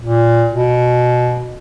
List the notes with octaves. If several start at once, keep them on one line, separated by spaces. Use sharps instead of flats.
A#2
B2